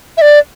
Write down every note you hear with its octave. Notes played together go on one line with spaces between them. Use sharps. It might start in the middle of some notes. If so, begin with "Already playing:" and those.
E5
D5